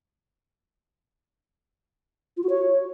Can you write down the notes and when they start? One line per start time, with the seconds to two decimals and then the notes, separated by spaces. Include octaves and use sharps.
2.37 F4
2.43 F#4
2.49 C#5